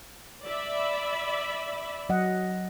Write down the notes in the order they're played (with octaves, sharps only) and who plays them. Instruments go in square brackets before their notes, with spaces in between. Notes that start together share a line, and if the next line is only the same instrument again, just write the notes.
[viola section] D5 E5 B5
[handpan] F#3 D#5 F#5